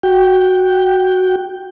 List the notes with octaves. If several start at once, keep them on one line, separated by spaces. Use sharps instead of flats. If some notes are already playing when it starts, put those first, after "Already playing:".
F#4 G5